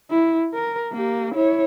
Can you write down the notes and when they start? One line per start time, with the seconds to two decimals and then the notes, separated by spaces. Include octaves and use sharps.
0.11 E4
0.54 A#4
0.92 A#3 G4
1.35 E4 C#5